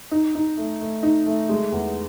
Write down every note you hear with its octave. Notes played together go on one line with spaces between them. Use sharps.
D#4
D#4
A3
A3
D#4
A3
G#3
E2